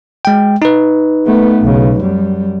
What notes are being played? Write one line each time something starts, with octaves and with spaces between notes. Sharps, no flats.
G#3 G5
D#4 B4
A3 B3
B1 C#3
F#2 G3